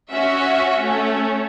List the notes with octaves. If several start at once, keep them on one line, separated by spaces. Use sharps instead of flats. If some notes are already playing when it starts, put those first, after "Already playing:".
C#4 F#4 E5
A3 C#4